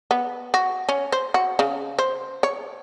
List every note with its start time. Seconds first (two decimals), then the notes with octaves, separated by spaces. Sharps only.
0.11 B3
0.54 F#4
0.89 C#4
1.12 C5
1.34 F#4
1.59 C#3
1.99 C5
2.43 C#5